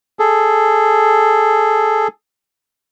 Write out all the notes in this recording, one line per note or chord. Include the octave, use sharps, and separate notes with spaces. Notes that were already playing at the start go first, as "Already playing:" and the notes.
G#4 A4